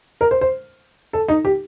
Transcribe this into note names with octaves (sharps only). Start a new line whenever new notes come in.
A#4
C5
C5
A4
D#4
G4